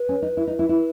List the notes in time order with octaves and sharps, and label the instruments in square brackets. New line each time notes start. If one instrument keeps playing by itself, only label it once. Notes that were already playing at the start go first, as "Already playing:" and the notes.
Already playing: [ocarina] B4
[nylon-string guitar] C#4
D#4
E4
D#4
E4
E4